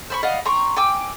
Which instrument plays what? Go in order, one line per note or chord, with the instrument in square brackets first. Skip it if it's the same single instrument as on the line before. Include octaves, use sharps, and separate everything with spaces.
[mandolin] C5 B5 C#6
D5 D#5 F5 F#5
G5 A#5 C6 C#6
G5 G#5 D6 E6